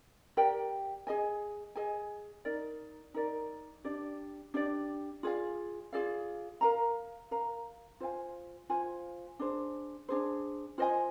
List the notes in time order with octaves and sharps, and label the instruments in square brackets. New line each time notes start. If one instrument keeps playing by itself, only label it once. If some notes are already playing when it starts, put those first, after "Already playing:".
[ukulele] G4 A#4 D5 G5
G#4 D#5 G#5
G#4 D#5 G#5
D#4 A#4 D5
D#4 A#4 D5
D4 G4 D5
D4 G4 D5
F4 G#4 D5 F5
F4 G#4 D5 F5
A#4 F5 A#5
A#4 F5 A#5
F4 C5 F5 G#5
F4 C5 F5 G#5
D4 G#4 C5
D4 G#4 C5
F4 C5 D#5 G#5